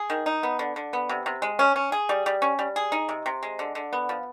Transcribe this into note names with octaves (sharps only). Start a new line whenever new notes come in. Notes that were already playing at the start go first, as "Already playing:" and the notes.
Already playing: G#4
D#3
D#4
B3
D3
D3
B3
C3
C3
G#3
C#4
C#4
G#4
G3
G3
C#4
G3
G#4
D#4
C3
C3
G#3
D3
D3
B3
F3